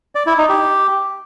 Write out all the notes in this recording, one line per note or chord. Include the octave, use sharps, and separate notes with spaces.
D5
E4
D#4
G4